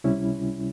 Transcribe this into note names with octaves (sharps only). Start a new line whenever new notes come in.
C#2 C3 G3 C#4 E4